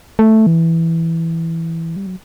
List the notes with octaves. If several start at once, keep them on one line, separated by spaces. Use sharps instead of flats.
A3
E3
G3
F#3